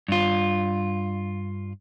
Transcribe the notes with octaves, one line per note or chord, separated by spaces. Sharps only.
G2 F4